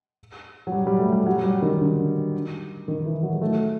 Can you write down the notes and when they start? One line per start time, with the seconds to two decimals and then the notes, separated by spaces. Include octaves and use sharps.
0.67 F#3
0.72 G3
0.87 G3
1.00 A3
1.12 G3
1.26 F#3
1.44 G3
1.62 D#3
1.80 D3
2.88 D#3
3.06 E3
3.23 F#3
3.33 G#3
3.42 A3